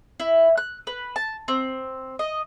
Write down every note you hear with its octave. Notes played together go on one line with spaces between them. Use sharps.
E4
F#6
B4
A5
C4
D#5